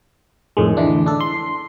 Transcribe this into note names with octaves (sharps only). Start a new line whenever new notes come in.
F2 A2 D#3 G#3
D3 E3 D4
D4 A4
C6